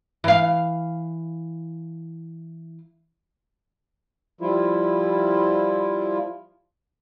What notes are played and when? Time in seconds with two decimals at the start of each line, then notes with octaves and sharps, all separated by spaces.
0.24 E3 F5
4.41 F3 G3 E4 F4